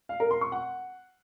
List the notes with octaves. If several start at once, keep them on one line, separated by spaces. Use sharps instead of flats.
F5
A#4
C6
C#6
F#5